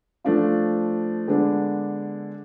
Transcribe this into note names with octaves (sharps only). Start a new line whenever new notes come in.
F3 A3 D4 F4
D3 G#3 B3 D4